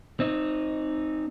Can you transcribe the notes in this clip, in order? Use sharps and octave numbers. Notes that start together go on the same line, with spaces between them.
C4 D#4